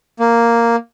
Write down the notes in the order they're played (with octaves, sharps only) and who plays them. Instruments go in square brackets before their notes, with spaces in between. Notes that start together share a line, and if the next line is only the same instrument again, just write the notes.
[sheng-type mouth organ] A#3